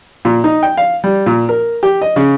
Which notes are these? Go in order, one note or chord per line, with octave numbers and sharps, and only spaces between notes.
A#2
D#4
G5
F5
G3
A#2
A#4
G4
D#5
C#3